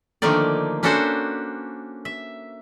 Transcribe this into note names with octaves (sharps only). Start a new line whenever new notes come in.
D3 D#3 F3 A3 A#3 D5
A#3 C#4 D4 F#4 A4 C5
E5